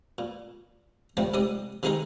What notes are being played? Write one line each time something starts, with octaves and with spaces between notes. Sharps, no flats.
A#2
A2 C3 F3 G3
G#2 C3 D5 D#6
C3 D#3 G#3 D#4 G#4 A#4